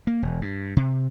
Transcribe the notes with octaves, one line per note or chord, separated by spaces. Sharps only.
A#3
E1
G2
C3